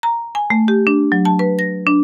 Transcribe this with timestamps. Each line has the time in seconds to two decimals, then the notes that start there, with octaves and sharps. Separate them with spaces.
0.03 A#5
0.35 G#5
0.50 A3
0.68 G4
0.87 D4
1.12 F#3
1.25 A5
1.39 B4
1.59 A#6
1.87 D4